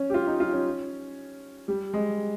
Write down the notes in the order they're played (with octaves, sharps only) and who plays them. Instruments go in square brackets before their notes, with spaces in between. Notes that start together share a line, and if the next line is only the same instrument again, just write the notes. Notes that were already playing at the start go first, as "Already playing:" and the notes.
Already playing: [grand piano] C#4
G4
F4
D#4
F4
C#4
G3
G#3